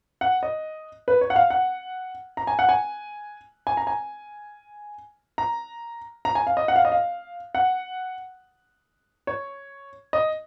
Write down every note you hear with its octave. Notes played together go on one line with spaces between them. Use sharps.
F#5
D#5
B4
C#5
F#5
F5
F#5
A#5
G#5
F#5
G#5
G#5
A#5
G#5
A#5
A#5
G#5
F5
D#5
F#5
F5
D#5
F5
F#5
C#5
D#5